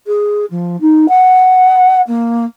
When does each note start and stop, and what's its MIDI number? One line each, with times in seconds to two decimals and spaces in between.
0.06 0.45 68
0.50 0.79 53
0.81 1.06 63
1.08 2.01 78
2.07 2.45 58